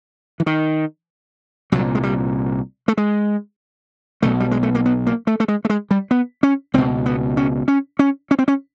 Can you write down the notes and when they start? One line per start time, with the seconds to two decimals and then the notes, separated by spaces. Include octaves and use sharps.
0.40 E3
0.46 D#3
1.72 C2 A#2 F#3
1.95 G#3
2.03 G3
2.88 A3
2.97 G#3
4.22 B1 B2 A3
4.40 G3
4.51 G#3
4.63 A3
4.75 A#3
4.86 B3
5.07 A#3
5.27 A3
5.40 A3
5.48 G#3
5.65 A3
5.70 G#3
5.91 G3
6.11 B3
6.43 C#4
6.74 C#2 B2 C4
7.06 B3
7.37 C#4
7.68 C#4
7.99 C#4
8.31 C#4
8.39 C4
8.48 C#4